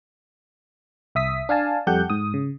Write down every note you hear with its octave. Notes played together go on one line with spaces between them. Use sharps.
C2 E5 D#6 B6
D4 F5 G#5 A5
F2 G3 G4 A4 F#5 G6
G#2 D#6
C#3